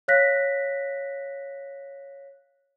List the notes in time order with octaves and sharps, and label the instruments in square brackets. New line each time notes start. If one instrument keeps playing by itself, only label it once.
[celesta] C#5 F5 F#6 A#6 B6